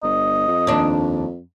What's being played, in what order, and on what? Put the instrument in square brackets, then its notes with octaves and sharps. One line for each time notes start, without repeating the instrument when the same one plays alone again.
[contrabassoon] G1 [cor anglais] D#5
[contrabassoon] F2
[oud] D#2 D4